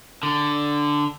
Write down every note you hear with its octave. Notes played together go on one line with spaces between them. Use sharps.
D3